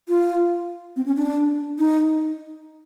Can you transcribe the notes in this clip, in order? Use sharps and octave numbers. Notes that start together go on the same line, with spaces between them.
F4
C4
C#4
D4
D#4